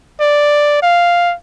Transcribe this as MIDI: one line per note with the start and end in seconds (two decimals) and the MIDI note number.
0.21 0.79 74
0.83 1.35 77